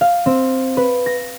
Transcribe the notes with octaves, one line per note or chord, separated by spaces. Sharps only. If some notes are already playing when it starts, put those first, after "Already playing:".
F5
C4
B4
A#6